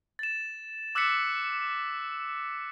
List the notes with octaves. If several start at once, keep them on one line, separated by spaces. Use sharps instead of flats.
A6 E7
D6 E6 F#6 A6 B6 C#7